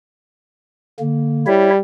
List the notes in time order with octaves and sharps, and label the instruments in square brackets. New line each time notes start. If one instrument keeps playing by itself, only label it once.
[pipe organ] D3 A#3
[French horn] G3 [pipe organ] E4 C#5 E5